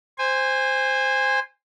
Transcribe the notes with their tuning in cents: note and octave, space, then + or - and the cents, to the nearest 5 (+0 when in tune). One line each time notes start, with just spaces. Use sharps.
C5 +0 G#5 -25